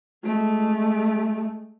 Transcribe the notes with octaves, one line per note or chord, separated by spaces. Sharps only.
G#3 A3